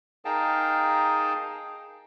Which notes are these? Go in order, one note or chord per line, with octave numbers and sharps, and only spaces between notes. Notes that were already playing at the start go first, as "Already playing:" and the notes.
D#4 G#4 A#4 F5 G5 A5